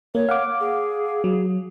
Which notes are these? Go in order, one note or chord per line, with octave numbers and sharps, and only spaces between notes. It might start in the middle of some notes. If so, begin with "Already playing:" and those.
A#3 C#5
F5 F#5 D6
G#4
F#3